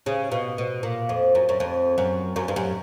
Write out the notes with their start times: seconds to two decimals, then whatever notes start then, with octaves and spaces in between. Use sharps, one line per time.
0.06 C#3
0.31 B2
0.58 B2
0.83 A#2
1.09 F2
1.35 F#2
1.49 F#2
1.60 F2
1.98 F#2
2.36 F#2
2.48 G2
2.56 F#2